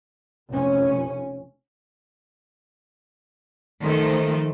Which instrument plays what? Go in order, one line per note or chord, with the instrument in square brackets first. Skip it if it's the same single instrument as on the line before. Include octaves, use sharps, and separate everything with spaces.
[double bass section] F1 C#4
[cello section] D#3 F3 A3